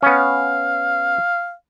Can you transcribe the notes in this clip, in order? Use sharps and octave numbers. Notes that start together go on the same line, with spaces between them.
B3 C#4 F5